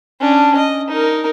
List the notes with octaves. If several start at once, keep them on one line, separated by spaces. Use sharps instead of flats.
C#4 D4
D#5
D#4 A#4